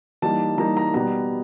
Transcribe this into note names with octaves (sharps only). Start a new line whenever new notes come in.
E3 G3 A#3 D#4 A5
E3 G3 A#3 D#4 A#5
A#5
B2 G3 B3 A#5